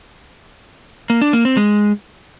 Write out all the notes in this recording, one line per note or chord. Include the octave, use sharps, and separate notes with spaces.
A#3
D4
A#3
C4
G#3